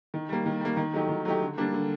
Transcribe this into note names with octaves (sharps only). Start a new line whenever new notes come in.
D#3
G3 A#3
D#3
G3 A#3
D#3
F#3 A3 D#4 G4
D#3
F#3 A3 D#4 G4
D3
G3 A#3 D4
D3